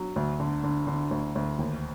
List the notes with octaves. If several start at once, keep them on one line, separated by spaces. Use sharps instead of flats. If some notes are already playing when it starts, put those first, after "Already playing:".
Already playing: F#3
D2
D3
D3
D3
D2
D2
D#2